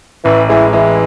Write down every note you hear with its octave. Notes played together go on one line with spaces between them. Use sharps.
A1 E3
E3 G#3
E3 G#3